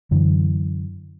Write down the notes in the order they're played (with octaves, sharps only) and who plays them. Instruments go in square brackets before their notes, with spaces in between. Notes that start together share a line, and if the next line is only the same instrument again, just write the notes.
[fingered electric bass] F#2 D3 E3